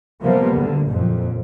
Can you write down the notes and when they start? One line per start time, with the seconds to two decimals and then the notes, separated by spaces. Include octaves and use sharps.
0.23 C3 F3 G3 A#3 B3
0.56 D2 D3
0.87 F#1 F2 A#2